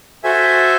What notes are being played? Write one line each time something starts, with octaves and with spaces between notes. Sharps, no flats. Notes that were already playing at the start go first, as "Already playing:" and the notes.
F#4 A4 C5 E5 G#5